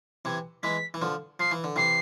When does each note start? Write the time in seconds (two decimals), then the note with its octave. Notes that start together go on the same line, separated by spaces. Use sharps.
0.25 C3 E3 G#6
0.63 E3 G#3 B6
0.94 E3
1.02 D3 F3
1.40 F3 C7
1.51 E3
1.64 D3
1.76 C3 E3 C7